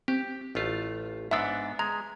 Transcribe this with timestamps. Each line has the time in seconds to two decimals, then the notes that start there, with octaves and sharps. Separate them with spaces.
0.08 C4 G4
0.55 A1 A3 F4
1.31 G#2 B3 D4 E5 E6
1.79 G#3 A#5